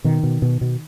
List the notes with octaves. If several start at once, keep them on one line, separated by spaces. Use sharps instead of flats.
B2 D#3
B2
B2
B2